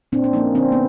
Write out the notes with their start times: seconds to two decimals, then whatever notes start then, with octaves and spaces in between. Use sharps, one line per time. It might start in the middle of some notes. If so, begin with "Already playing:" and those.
0.12 A#2 C4 D4
0.24 D4
0.33 F3 A#3 C#4 D#4
0.55 D3 C4 D4
0.72 B3